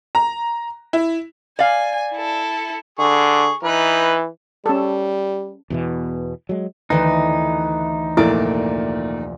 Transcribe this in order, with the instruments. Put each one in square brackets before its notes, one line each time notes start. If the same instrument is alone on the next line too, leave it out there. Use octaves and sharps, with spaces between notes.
[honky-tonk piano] A#5
E4
[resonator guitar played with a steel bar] D5 F5 [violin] G#5
[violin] E4 A4
[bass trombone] D3 [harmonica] G#4 C#6
[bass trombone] E3 [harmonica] D#4 B4
[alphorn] G3 [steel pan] C#4 A4
[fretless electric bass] E2 B2 E3
F#3 G#3
[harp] D2 D#3 E3 [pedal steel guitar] D#4 [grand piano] B4
[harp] F1 D5 D6 [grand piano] A#2 A3 A#3 [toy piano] E4